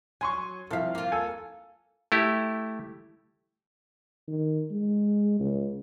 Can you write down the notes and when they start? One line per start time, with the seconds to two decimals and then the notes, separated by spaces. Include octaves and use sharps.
0.21 F#3 G#5 C6 C#6
0.71 C2 F3 A4 E5 F5
0.95 A#3 F4
1.12 A4 G#5
2.12 A3 E4 G4
4.28 D#3
4.71 G#3
5.40 C#2